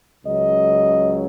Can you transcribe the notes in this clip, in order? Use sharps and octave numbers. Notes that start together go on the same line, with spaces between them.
C#2 C#3 F#3 D#5